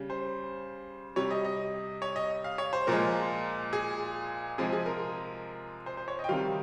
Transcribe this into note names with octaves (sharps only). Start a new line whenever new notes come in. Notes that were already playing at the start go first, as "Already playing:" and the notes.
Already playing: C#3 G3
C5
C3 G3 C#5
D#5
D#5
C#5
D#5
F5
C#5
C5
A#2 F3 G#3 A#4
G#4
C3 F3 G#3 G#4
G#4
A#4
C5
C5
C#5
D#5
G5
C3 D#3 G3 F5